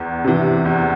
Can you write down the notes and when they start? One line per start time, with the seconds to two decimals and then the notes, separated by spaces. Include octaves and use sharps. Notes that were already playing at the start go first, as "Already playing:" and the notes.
Already playing: E2
0.24 C3 E3
0.65 E2